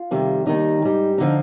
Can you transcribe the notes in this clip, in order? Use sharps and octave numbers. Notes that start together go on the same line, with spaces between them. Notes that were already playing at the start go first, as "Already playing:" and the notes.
Already playing: F4
F2 C3 D#3 G3
D#2 D#3 G3 D#4
G#2 G3
D3 F3 D#4